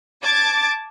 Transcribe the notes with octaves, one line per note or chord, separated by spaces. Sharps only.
A5 D6 G#6 A6